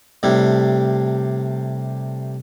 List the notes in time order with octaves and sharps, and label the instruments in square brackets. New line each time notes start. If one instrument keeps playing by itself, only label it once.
[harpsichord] A2 C3 G3 D4 E4